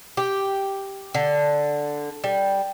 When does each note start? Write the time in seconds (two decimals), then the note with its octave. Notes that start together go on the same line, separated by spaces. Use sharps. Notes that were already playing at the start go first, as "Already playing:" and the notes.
0.17 G4
1.15 D3
2.24 G3